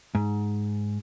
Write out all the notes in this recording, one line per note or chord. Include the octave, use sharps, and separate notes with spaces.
G#2